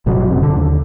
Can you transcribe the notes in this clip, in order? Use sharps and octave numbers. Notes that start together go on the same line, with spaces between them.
G1 B2 F#3
F#2 C3
D3
D#2